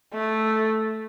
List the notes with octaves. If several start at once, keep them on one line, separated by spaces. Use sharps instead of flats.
A3